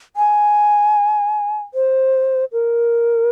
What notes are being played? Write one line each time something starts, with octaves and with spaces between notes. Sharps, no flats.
G#5
C5
A#4